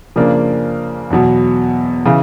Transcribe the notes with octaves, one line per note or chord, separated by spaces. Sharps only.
C#3 F3 A#3 D4
E2 B2 F#3
C#3 E3